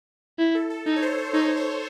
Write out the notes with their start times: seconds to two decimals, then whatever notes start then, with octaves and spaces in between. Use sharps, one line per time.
0.39 E4
0.55 A4
0.70 A4
0.86 D#4 A4
0.96 C#5
1.02 C5
1.18 C5
1.34 D#4 C#5
1.57 C#5